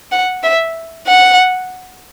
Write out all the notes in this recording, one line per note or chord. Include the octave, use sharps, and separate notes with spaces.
F#5
E5
F#5